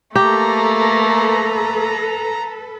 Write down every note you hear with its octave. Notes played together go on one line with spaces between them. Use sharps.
A3 A#3 G4 A4 B4 A#5